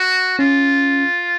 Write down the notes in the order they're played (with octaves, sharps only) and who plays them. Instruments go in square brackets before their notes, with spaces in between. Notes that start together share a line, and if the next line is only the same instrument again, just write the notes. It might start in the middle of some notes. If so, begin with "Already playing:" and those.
Already playing: [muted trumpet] F#4
[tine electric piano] C#4 [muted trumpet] F4